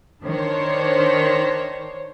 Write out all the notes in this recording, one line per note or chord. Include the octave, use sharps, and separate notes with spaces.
D#3 D4 C5 C#5